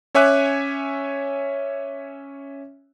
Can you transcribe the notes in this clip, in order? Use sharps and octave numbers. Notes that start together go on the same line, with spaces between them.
C#4 C#5 E5 G#5 D6 F#6